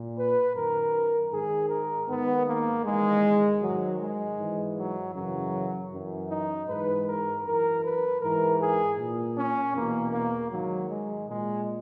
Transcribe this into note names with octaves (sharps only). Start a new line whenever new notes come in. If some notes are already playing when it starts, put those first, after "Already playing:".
Already playing: A#2
B4
F#2 D#3 A#4
G#2 D#3 G#4
A#4
G#2 D#3 B3
A#3
E2 D#3 G#3
G#2 D#3 F#3
G#3
G#2 E3
F#3
F#2 C#3 E3 F#3
F#2 E3
D#4
G#2 E3 B4
A#4
F#2 E3 A#4
B4
G#2 E3 A#4
G#4
A#2
C#4
E2 B2 A#3
A#3
G#2 D#3 F#3
G#3
A#2 G#3